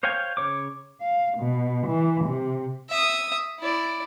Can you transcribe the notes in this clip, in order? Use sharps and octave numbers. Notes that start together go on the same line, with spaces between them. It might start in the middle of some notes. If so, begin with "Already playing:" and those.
C5 C#5 F5 G5 G#5
C#3 C#5 D6
F5
B2
E3
C3
E5 D#6
E4 D5